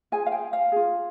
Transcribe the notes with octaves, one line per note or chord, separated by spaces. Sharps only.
F4 G#4 G#5
F5
G5
F5
F4 G#4